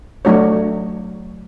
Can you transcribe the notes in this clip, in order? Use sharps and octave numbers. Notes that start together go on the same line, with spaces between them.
F#3 A3 D4 F#4 C#5